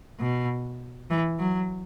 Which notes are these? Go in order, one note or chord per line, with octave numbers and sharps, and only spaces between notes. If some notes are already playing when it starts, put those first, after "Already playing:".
B2
E3
F#3